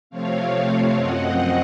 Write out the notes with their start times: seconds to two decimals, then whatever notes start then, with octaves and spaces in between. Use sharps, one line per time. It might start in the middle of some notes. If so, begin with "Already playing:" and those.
0.10 C3 F3 A3 C4 C#5 F5
0.51 C#5 F5
0.93 F#2 F3 C4 D#5 F#5